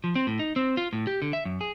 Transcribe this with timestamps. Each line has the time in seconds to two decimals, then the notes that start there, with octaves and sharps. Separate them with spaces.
0.04 F3
0.15 C4
0.27 A2
0.39 D#4
0.56 C4
0.77 F4
0.93 A2
1.07 G4
1.22 D3
1.33 E5
1.45 F#2
1.61 G#4